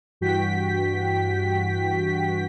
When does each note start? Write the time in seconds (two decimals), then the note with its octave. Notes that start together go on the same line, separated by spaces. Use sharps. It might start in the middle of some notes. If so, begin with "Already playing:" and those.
0.21 G2 E3 F#4 G5 B6